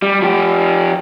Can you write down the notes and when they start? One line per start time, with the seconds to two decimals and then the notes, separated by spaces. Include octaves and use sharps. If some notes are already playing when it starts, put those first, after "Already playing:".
0.02 G3
0.22 F3 G4